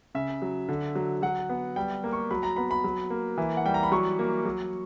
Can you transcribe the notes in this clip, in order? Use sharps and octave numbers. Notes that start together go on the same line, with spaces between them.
C#3 E5
F#3
D3
F#3
F#3 F#5
B3
G3 G5
A#3
C#6
F#3 B5
A#5
B3 B5
B5
F#3
A#3
E3
F#5
G3 G5
A#5
B5
F#3 C#6
A#3
F#3